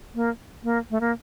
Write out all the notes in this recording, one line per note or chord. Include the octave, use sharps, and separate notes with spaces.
A#3
A#3
A3
A#3